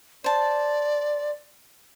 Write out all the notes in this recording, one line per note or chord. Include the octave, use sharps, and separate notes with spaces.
C5 D5 A5